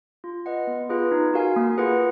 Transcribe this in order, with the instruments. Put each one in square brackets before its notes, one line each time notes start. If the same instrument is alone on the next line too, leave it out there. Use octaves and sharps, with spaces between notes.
[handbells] F4
B4 D#5 F#5
B3
F4 G#4 B4 F5
D#4
F#4 A#4 F5 G#5
A#3
F4 G#4 B4 F#5